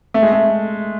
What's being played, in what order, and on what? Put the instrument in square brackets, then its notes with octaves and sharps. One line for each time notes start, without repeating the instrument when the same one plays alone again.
[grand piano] A3
G#3
A3